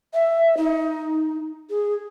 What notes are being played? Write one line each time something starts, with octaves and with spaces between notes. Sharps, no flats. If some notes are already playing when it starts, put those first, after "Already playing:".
E5
D#4
G#4